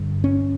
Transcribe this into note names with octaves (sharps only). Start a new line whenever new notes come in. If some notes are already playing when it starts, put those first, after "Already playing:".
Already playing: G2 D3
C#4